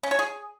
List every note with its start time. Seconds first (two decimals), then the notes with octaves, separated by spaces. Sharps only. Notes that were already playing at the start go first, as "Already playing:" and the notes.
0.03 C#4
0.11 C#5
0.19 G#4